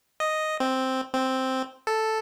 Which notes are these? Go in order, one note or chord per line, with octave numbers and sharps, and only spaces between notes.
D#5
C4
C4
A4